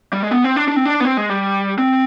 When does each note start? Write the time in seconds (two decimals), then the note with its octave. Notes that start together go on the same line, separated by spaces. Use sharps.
0.13 G3
0.23 G#3
0.31 B3
0.44 C4
0.56 D4
0.68 D4
0.76 C4
0.85 D4
1.00 B3
1.05 C4
1.17 G#3
1.29 G3
1.78 C4